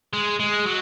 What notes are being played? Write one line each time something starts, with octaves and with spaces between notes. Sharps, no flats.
G#3
G#3
F#3